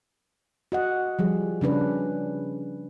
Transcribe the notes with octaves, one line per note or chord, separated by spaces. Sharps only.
F#4 D#5 F#5
F3 G3 G#4
C#3 C#4 D4 B4